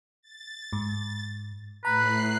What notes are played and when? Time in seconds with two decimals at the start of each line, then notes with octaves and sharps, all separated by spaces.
0.22 A6
0.73 G#2
1.85 A2 B4 A#5 F#6 C7